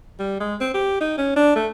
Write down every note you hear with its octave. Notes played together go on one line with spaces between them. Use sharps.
G3
G#3
C4
G4
D#4
C#4
D4
A3